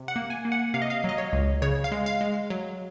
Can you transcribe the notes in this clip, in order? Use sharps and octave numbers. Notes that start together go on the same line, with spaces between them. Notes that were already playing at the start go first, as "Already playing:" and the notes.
Already playing: C3
F#5
A#3
G#5
A#3
F#5
C3 F5
D#5
F5
F#3
D#5
C#5
C#2
C#3 C#5
F5
G#3
F5
G#3
F#3